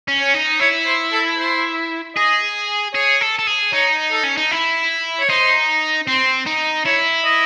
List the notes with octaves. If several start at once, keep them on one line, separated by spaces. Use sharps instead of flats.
C#4
C#5
D#4
E4 C#5
C5
A4
C5
G#4 D#5
G#4 C#5
A4
A4
G#4
D#4 C#5
A4
C#4
D#4
E4
C#5
D#4 C5
C4 C5
D#4
E4 C#5
D#5